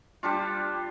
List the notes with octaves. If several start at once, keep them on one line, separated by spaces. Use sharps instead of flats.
G3 D4 F4